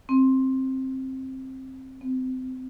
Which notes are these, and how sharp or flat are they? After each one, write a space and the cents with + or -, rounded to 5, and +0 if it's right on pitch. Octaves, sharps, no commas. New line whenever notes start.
C4 +10
C4 -25